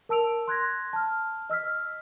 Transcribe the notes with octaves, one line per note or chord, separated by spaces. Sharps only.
A#4 A5 E6 D7 F7
C6 F#6 G#6 A#6
A5 F6
D#5 E6 F6 B6